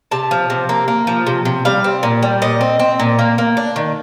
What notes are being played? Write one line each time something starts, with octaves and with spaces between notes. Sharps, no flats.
C3 A5
F3
C3
A#3
A#3
F3
C3
C3
G3 F5
C4
A#2
G3
A#2 D#5
C4
C4
A#2
A#3
A#3
D4
D#3